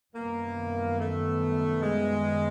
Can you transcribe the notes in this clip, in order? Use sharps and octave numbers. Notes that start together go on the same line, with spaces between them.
F#2 D#3 G3 A#3 B3
A3
G#3